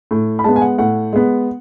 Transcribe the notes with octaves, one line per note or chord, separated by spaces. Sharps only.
A2
B5
G#3 B3 A5
G#5
F#5
A2 F#5
G#3 B3